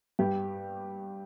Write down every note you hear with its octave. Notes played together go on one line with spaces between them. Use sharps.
G2 G3 G4